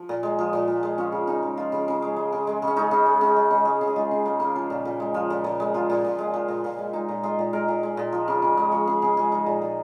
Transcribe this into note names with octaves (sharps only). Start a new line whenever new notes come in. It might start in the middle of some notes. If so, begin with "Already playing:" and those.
Already playing: F3
A#2
G#3
F3
A#2
A#2
G#3
F3 C#4
C#3
C#3 D#4
G#3
F3 F4
C#3
C#3
G#3
G#3
C#3
G#3
C#3
C#4
G#3 D#4
C#3
G#3
C#3
G#3
C#3
G#3
C#3
G#4
G#3 F4
C#3
G#3 A#3
C#3 A#3
F3 C#4
A#2
A#2
G#3
F3
A#2
A#2
G#3
F3 F4
A#2
A#2
G#3
F3
A#2
A#2
G#3
G#3 D#4
A#2
G#3 F4
A#2
G#3 A#4
A#2
G#3
A#2
F3
C#3
C#3
G#3
F3 C#5
C#3 G#4
C#3 G#4
G#3 G#4
F3 D#4
A#2
A#2